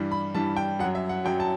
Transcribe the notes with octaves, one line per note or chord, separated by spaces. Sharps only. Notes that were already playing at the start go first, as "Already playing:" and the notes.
Already playing: G2 E3 G3
B5
G2 E3 G3 A5
G5
F#2 F#3 F#5
E5
F#5
F#2 F#3 G5
A5